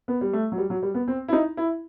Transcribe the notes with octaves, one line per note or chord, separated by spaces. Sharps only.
B3
G3
A3
F#3
G3
F#3
G3
B3
C4
E4
D#4
E4